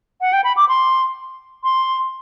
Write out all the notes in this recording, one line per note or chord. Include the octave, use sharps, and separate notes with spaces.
F#5
G5
B5
D6
C6
C6